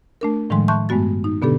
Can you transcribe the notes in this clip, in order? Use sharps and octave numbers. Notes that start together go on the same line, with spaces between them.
A3 D4 A#4
A2 D#3 F3 G3 G#3 C6
E5 A5 C6 C#6 F#6 G6
G2 G#3 A3 B3 F#4 A6
D#4
B2 D3 B3 D4 G4 A4